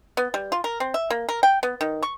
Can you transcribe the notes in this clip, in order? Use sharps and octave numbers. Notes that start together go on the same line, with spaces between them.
B3
G3
F4
A#4
C4
E5
A#3
A#4
G5
B3
D#3
C#6